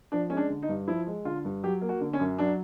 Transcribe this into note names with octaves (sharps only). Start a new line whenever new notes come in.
F3 D4
G#3 C#4
D4
D3
D#4
G2
F3 E4
G#3
D3 F4
G2
F#3 G4
A#3
F#4
D3
C#4
F#2
F#3 D4